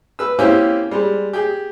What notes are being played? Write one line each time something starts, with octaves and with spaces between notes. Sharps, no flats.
B4 E6
A#3 C4 C#4 E4 G4
G3 G#3
G4 G#4